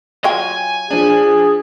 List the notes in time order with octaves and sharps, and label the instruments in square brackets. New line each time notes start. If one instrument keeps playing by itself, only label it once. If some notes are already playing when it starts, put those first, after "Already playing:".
[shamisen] F#3 F4 G5 [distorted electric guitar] G#5
[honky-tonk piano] F3 D4 [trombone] G#4